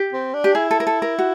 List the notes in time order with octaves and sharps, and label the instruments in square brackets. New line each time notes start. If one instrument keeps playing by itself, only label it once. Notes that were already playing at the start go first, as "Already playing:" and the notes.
Already playing: [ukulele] G4
[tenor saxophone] C4
D4
[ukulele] G4
[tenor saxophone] E4 [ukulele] G#4
[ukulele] A4
A#4
A4
A#4
F#4